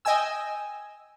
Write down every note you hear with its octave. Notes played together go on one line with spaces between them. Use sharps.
D#5 G5 G#5 E6